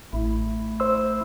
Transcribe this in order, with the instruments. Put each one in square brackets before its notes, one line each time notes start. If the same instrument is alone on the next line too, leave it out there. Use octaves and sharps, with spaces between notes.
[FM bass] A1 [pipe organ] A3 E4
[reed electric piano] C5 C6 E6